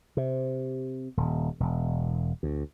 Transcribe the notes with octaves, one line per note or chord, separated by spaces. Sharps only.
C3
D#1
E1
D2